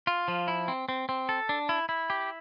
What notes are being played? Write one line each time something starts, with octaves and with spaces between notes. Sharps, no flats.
F4
F3
E4
C4
C4
C4
A4
D4
E4
E4
G4